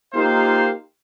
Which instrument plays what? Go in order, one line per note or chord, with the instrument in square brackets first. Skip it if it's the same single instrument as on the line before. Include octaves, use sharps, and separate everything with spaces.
[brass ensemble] A#3 D#4 F4 G4 C5 F5